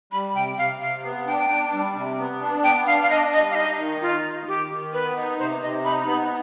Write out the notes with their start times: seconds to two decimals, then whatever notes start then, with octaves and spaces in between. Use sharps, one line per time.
0.12 G3 B5
0.34 C3 G5
0.57 C3 F5
0.80 C3 F5
1.04 B3
1.27 D4 G5
1.49 D4
1.73 G3
1.95 C3
2.18 B3
2.41 D4
2.63 B3 G5
2.87 D4 F5
3.02 F5
3.10 D4 D#5
3.33 G3 D#5
3.51 F5
3.55 D#4 D#5
3.78 D#3
4.01 D#4 F4
4.24 D#3
4.47 D#3 G4
4.70 D#3
4.93 B3 B4
5.16 D#4
5.39 C3 C5
5.62 C3 D#5
5.85 D#4 B5
6.07 B3 B5